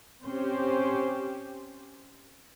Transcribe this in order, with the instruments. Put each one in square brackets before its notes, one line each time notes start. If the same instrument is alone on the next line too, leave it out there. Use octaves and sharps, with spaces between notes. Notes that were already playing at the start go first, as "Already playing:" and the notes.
[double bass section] C4 [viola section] C#4 G4 C5